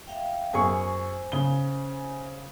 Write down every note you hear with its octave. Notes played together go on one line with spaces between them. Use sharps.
E5 F5 G5
F#2 G#4 C5 G#5 C#6
C#3 G7